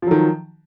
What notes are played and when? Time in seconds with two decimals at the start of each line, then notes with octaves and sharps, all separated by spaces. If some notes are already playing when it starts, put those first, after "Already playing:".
0.02 F3
0.07 F#3
0.11 D#3